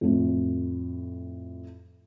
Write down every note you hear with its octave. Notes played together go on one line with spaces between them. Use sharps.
F2 A2